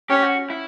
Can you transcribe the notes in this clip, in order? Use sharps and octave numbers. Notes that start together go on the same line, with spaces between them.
C#4 G4
F#4
E4